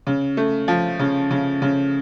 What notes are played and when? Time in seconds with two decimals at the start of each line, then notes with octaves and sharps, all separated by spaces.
0.07 C#3
0.37 A3
0.68 F3
0.99 C#3
1.31 C#3
1.62 C#3